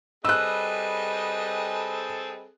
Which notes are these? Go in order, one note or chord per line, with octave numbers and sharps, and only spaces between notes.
G3 C4 G#4 A4 B4 D#5 E6 F#6